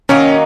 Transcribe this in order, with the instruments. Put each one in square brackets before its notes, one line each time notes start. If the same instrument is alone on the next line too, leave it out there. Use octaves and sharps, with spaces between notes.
[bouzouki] D#3 F#3 A#3 D#4 [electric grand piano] C#4